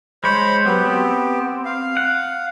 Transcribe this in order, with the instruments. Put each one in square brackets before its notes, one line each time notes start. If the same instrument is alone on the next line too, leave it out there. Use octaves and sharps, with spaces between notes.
[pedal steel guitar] G#3 C#5 [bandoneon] C5 B5
[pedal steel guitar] F#3 [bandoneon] B3 G4
[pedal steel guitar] C4
[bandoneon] F5
[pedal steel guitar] F#5